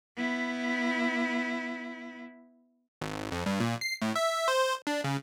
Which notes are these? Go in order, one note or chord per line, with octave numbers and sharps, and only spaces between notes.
B3 E4
G#1
F2
G2
A#2
C7
A2
E5
C5
D4
C#3